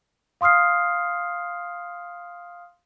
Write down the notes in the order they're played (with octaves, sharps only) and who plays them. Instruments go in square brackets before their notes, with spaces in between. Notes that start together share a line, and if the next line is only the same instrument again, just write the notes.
[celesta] F5 C6 D#6 F6 C7